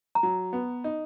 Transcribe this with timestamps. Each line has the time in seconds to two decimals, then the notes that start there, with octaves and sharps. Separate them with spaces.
0.15 A#5
0.23 F#3
0.53 B3
0.84 D#4